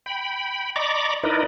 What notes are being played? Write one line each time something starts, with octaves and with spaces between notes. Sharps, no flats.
G5 B5
D5 D#5 A#5 B5 C#6 D6
D#4 E4 A#4 B4 D5 D#5